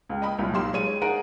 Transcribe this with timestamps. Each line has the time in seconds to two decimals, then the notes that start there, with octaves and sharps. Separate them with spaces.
0.09 C#2
0.22 D#5 G5 B5 D#6
0.39 C2 A#2 F#3
0.53 B1 A#2 G4 C6 E7
0.73 G#3 C#5 D#7
1.01 D#4 G#4 A#4 F#5 D7